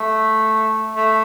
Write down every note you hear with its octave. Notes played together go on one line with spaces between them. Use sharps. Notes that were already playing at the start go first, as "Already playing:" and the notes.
Already playing: A3
A3